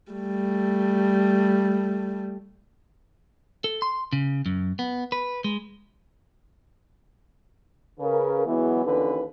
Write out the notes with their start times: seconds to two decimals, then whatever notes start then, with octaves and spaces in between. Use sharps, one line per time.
0.12 G3 A3
3.64 A4
3.82 C6
4.13 C#3
4.46 F#2
4.79 B3
5.12 B4
5.44 G#3
8.00 C#3 A#4 B4
8.46 E2 E3 F#3 G#3 B3
8.84 D#2 D3 E3 C#4 B4